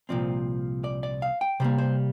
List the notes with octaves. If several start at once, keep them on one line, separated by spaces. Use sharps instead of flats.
C2 A#2 F3 C4 D5
D5
D5
F5
G5
C3 G3 A#3 C5
C5